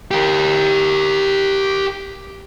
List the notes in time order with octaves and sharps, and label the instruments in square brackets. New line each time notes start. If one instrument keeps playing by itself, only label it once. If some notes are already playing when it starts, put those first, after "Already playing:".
[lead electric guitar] G4 A#4